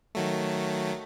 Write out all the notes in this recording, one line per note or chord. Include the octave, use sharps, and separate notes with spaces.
D#3 F#3 A3